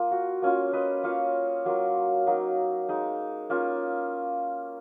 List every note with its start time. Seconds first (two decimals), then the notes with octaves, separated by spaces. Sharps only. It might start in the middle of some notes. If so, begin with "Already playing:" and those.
Already playing: A#3 F4
0.12 F#4
0.42 A#3 C#4 F4
0.73 B4 D#5
1.04 A#3 C#4 F4 C#5 F5
1.66 F#3 A#3 F4
2.27 F#3 A#3 D#4
2.89 G#3 D#4
3.50 A#3 C#4 F4